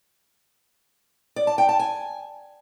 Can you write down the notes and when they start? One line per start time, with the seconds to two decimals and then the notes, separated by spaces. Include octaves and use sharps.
1.36 D5
1.47 A5
1.58 G5
1.69 A5
1.79 G#5